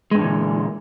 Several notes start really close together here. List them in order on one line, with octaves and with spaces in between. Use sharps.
G#3 G2 D3 E3 A#2